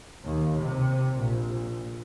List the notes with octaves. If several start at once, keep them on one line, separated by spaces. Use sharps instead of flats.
D#2
C3
A#1